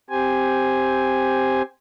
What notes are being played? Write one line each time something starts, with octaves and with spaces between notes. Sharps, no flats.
C4 G4 C5 G#5